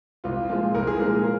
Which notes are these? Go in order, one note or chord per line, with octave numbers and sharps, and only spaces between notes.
C2 F4
A#2 F3 G#3 F4
C2 A#4
G#4
A#2 F3 G#3 A#4
G#4
A#4